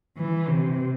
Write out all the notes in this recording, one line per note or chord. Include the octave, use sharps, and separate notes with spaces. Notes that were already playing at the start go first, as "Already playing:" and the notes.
E3
C3